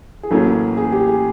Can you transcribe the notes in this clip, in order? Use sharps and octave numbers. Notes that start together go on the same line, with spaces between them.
G#4
A1 A2 F#3 A#3 C#4 A4
G#4
G4
G#4